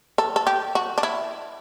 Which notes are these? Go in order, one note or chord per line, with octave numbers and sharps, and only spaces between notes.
A4
A4
G4
F#4
D4
E4